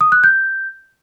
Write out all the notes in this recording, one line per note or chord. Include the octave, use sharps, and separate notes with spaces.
D#6
F#6
G6